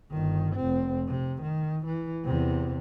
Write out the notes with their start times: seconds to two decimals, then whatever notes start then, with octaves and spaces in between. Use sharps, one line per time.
0.11 G1 D#3
0.56 F1 C4
1.08 C3
1.42 D#3
1.86 E3
2.25 E2 C3